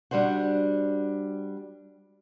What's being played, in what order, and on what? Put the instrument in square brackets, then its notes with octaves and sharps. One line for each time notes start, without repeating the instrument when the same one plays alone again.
[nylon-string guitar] G3 D4 F#4 C5 F#5